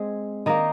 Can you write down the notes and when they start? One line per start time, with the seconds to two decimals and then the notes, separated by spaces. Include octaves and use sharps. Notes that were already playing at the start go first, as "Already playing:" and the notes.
Already playing: G#3 C4 G#4
0.46 D#3 A#3 D#4 D#5